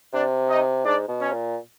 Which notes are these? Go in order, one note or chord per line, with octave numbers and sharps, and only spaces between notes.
C3 D4 D5
D#4 D#5
G#2 D4 D5
B2
C#4 C#5
A#2